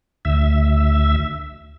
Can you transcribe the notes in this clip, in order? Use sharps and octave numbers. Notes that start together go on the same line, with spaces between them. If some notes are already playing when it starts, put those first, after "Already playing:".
D2 E5